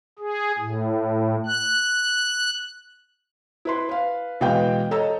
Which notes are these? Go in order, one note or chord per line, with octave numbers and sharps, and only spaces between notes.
G#4
A2
F#6
E4 B4 C6
B4 F5
B2 E3 G#3 F5 G5 G6
A4 C#5 D#5 A#5 E6